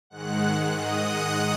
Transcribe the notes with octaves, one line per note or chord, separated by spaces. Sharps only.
G#2 D#3 G#3 F#5 F#6
D#5 D#6
F#5 F#6